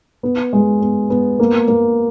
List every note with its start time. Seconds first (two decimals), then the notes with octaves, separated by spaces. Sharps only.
0.23 B3
0.53 G#3
0.81 B3
1.10 B3
1.39 A#3
1.68 A#3